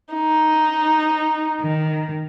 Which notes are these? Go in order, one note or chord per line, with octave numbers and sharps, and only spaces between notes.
D#4
D#3